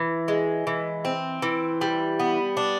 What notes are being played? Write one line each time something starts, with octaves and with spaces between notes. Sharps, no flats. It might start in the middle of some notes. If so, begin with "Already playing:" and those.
Already playing: E3
G#3
E3
C4
E3
G3
B3
D4